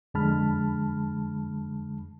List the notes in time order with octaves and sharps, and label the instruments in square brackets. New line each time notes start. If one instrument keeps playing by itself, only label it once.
[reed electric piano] F2 D3 G#3 A5 B5 F6